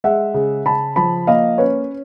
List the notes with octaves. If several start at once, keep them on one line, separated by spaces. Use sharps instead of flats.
G#3 E5 F#5
C#3
C#3 A5 B5
F3 A5 B5
A#3 D#5 F5
C#4 B4 C#5